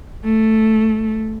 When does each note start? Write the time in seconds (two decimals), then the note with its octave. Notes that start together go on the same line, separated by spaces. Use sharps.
0.25 A3